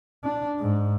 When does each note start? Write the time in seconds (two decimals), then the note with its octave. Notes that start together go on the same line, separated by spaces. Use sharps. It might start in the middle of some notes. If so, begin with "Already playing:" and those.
0.24 D4
0.60 G#2